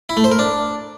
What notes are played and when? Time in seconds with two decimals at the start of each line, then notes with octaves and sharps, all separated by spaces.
0.09 E4
0.17 A3
0.24 C5
0.31 A#4
0.39 D4